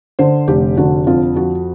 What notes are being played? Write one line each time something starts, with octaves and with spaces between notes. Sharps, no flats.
D3 C5
F1 G4
D3 F#4
F2 F4
F3 F#4